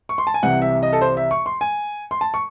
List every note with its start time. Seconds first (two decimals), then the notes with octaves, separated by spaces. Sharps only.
0.09 C#6
0.18 C6
0.27 A5
0.34 G#5
0.42 C2 C3 E3 F#5
0.62 E5
0.83 D#5
0.93 A4
1.01 C5
1.17 E5
1.31 C#6
1.46 C6
1.61 G#5
2.11 C6
2.21 A5
2.34 C#6